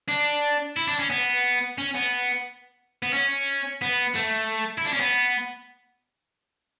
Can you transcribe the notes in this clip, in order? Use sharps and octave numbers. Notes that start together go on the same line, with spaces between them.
D4
E4
D4
C#4
B3
C#4
B3
B3
C#4
B3
A3
E4
D4
C#4
B3